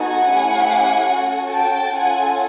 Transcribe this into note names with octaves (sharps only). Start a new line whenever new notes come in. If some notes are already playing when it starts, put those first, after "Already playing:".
Already playing: B3 D#4 F#4 A4 F#5 G#5
A3 C#4 E4 G4
C#4 F#4 A4
G5 A5
C#4 F4 A4 F#5 G#5